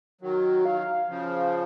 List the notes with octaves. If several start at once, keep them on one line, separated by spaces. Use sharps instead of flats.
D#3 F#3 F#4
F5
C#3 F3